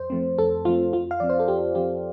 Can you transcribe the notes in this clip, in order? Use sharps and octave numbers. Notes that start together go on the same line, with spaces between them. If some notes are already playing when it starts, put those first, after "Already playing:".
Already playing: F2 C5
F3 A3 C4
F2 A4
F3 A3 C4 F4
F2 F4
F5
F3 C4 D5
C5
A4
F2 G4
F3 C4 G4